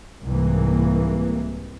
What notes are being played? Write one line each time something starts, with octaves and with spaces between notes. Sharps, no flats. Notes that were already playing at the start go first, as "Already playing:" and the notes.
C2 G#2 E3 A#3